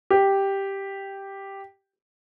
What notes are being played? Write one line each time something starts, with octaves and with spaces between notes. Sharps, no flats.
G4